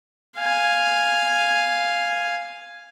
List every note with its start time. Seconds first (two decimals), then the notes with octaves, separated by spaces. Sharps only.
0.37 F5 G#5